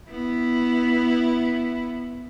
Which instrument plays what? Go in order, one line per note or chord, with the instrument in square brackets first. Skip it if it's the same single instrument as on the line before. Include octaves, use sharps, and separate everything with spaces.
[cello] B3 E4